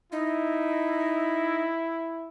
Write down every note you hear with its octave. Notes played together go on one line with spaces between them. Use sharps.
D#4 E4